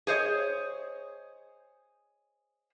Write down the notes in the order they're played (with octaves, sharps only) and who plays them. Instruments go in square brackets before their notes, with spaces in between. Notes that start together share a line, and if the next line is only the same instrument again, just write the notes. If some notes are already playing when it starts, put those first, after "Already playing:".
[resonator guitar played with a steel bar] G#4 C5 C#5 D#5